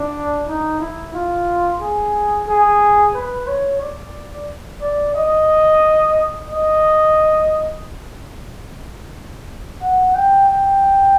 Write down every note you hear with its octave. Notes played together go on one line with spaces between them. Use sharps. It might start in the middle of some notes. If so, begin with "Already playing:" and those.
Already playing: D4
D#4
E4
F4
G#4
G#4
B4
C#5
D5
D5
D#5
D#5
F#5
G5
G5